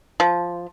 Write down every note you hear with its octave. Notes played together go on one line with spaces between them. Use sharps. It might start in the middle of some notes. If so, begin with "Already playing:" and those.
F3